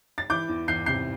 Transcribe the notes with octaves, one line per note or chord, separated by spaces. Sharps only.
A6
E3 D6 G6
E2
E2 G6 C7
C3 G6 C7